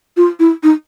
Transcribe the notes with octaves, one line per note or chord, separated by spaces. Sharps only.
F4
E4
D#4